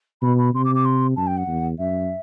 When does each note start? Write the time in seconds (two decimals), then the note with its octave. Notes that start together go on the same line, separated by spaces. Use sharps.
0.22 B2 B5
0.38 B5
0.54 C3 C6
0.65 D6
0.75 D6
0.85 C6
1.16 F#2 A5
1.27 G5
1.37 F#5
1.48 E2
1.79 F#2 E5